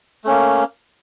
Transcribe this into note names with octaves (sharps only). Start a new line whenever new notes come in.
A3 A#3 C#4